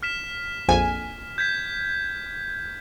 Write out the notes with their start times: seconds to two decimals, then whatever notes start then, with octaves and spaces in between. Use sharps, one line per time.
0.03 F6 B6 E7
0.68 A#1 F2 G#5
1.38 G6 G#6 B6